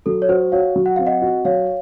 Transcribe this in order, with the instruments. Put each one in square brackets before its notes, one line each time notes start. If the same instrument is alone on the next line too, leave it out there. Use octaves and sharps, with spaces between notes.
[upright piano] F#3 [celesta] A4
[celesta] C#5
[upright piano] F#4 [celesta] C5
[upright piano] F#4 [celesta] C#5 F5
[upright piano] F#3
[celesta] F#5
[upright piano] C4 [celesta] F5
[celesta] D#5 F#5
[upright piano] F#4
[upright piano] F#3 [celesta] C#5 F5